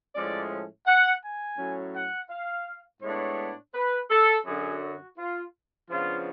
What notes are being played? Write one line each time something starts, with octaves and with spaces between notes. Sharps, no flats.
A2 F3 G#3 C#4 D5
F#5
G#5
A2 F#3 C#4
F#5
F5
A2 G#3 B3 D4 C#5
B4
A4
F#2 D3 F#3 C#4 G#4
F#4
F4
C#3 F3 B3 D4 F4